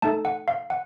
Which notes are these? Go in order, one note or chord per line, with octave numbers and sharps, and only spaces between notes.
A3 D#4 A4 A5
F#5
F5
F#5